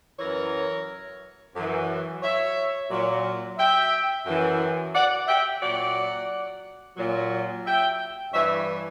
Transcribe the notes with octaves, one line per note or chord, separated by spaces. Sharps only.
F#2 E3 A#4 C#5
F#2 E3
C#5 E5
A#2 F#3
E5 G5
F#2 E3
D5 F#5
E5 G5
A#2 F#3 D5 F#5
A#2 F#3
E5 G5
G2 E3 C#5 E5